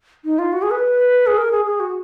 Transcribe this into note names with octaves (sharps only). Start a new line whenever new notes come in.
D#4
F4
F#4
G#4
B4
G#4
A#4
G#4
G#4
F#4